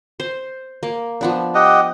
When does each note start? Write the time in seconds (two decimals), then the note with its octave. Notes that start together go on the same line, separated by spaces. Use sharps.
0.20 C5
0.83 A#3
1.21 F3 B3 D4
1.55 G4 D#5 F#5